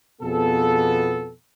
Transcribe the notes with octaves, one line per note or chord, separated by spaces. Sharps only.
F2 B2 F3 B3 G#4 A4